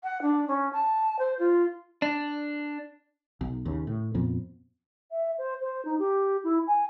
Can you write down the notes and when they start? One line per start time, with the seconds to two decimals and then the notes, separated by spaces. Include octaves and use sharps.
0.03 F#5
0.22 D4
0.48 C#4
0.73 A5
1.19 C5
1.39 F4
2.02 D4
3.41 B1
3.65 D#2 C#3
3.87 A2
4.14 F2 A#2 F3 B3
5.11 E5
5.38 C5
5.61 C5
5.85 D#4
5.99 G4
6.44 E4
6.67 G#5